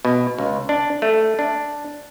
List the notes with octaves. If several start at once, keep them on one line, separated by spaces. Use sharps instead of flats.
B2
C#2
D4
A3
D4